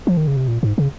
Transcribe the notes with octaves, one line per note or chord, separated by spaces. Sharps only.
F3
D#3
C#3
C3
A#2
G#2
C#3